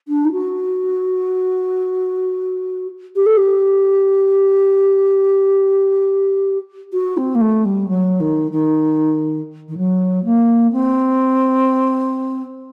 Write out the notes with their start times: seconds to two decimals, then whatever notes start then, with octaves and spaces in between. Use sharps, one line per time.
0.08 D4
0.24 D#4
0.32 F#4
3.16 G4
3.26 A4
3.37 G4
6.93 F#4
7.17 C4
7.35 A#3
7.41 A3
7.65 G3
7.88 F#3
8.20 D#3
8.51 D#3
9.68 D#3
9.77 F#3
10.24 A#3
10.72 C4